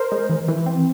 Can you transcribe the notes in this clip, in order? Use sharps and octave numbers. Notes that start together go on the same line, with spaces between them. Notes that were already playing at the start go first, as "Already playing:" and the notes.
Already playing: A#4 C5
G#3
E3
E3
C4